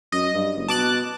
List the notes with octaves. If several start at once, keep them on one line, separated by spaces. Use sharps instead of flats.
F#2 D#5
G2
F#1
B2 A5 D6 F#6